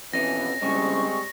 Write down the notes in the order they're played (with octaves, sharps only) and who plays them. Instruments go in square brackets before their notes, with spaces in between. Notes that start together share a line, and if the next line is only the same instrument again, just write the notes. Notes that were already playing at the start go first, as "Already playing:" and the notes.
[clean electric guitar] F2 C#4 [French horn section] B2 E3 B3 [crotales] A#6
[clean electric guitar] G2 C#3 [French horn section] G3 G#3 C4 [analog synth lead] C#6